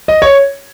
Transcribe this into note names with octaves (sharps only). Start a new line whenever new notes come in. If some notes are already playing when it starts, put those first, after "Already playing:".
D#5
C#5